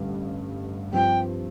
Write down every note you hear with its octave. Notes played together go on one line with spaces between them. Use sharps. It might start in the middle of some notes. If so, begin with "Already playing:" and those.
Already playing: A1 G2 D3
G2 F3 C4 F4 G5